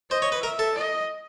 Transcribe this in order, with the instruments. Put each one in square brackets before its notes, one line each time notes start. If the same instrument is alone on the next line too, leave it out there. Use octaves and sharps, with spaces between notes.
[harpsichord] C5 [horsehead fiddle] D#5
[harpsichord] C#5
B4
[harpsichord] A#4 [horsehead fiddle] E5
[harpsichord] A4
[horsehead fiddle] D#5